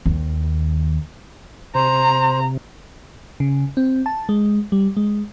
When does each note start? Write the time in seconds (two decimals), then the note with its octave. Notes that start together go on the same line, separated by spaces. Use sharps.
0.06 D#2
1.75 C3 C5 A#5
3.40 C#3
3.77 C4
4.06 A5
4.29 G#3
4.72 G3
4.97 G#3